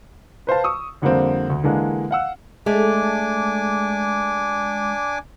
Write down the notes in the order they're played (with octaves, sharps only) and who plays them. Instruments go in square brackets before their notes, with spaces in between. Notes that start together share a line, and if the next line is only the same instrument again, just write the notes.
[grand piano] B4 C5 F5 A5
C#6 D#6 E6
F2 D3 G3 A#3 C4
D2
D3 E3 G#3 A#3 D4
F5 F#5 E6
[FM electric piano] G#3 [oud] A3 [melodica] D4 G#5 D6